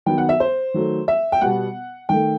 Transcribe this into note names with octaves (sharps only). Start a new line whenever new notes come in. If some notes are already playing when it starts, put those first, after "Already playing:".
D#3 F#3 B3 G5
F#5
E5
C5
D#3 F#3 A3
E5
G5
B2 G3 B3 F#5
D#3 A3 G5